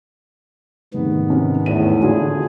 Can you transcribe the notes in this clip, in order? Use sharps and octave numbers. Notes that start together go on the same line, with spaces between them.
F1 G#2 D#3 B3
C3 C#4
E2 A2 D#7
D3 F4 G#4